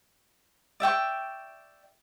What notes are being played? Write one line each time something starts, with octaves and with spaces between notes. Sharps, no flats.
D5 E5 G5 C#6